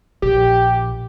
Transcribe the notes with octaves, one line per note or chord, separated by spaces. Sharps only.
A#1 G4